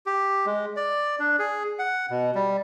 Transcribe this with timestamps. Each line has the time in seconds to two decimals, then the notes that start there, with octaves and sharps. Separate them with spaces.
0.06 G4
0.46 G#3
0.76 D5
1.20 D4
1.39 G#4
1.79 F#5
2.10 B2
2.35 G3